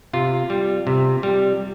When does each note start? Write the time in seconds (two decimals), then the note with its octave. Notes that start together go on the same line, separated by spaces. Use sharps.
0.13 C3 F4
0.50 G3
0.87 C3
1.23 G3